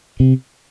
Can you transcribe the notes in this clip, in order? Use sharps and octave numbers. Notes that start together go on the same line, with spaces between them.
C3